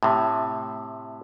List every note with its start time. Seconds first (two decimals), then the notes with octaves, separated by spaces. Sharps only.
0.03 A2 C3